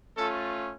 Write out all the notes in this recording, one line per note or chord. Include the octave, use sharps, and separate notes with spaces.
A3 C#4 F4 A4